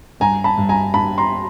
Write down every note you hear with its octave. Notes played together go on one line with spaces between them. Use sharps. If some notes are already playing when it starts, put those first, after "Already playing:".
G2 G#5 A#5
A5 B5
G2
G#5 A#5
G2 A5 B5
A#5 C6